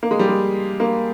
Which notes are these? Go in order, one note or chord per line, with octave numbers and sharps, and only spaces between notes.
A#3
G#3
G3
G#3
A#3